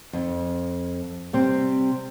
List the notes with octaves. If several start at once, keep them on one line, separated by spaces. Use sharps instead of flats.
F2
C3 G3 C4